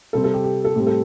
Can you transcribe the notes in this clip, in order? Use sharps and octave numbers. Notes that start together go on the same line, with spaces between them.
C3 G3 C4 A4
A4
G4
G4
A4
A2 G3 C4 G4
A4